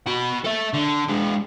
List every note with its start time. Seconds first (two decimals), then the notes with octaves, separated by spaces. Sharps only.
0.07 F#4 B5
0.44 A4 E5
0.73 D3
1.08 G#3 D4